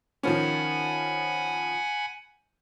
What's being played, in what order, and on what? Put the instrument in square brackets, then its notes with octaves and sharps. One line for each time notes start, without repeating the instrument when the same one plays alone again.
[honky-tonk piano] D#3 F3 C#4 [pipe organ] F#5 G#5 B5